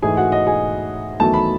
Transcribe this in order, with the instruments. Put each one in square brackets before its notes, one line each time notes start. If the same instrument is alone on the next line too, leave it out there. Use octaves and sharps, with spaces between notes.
[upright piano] G#2 E3 A3 G#4 G#5
F#4 F#5
D#5
G#4 G#5
E2 D#3 F#3 A3 A5
B5